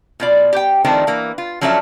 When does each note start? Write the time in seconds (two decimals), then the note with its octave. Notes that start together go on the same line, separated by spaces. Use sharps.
0.20 B2 F4 D5
0.53 G4 G5
0.85 D#3 F3 A3 C4 D4
1.07 E3 A#3
1.38 F4
1.61 F3 F#3 C#4 D4 A4 E5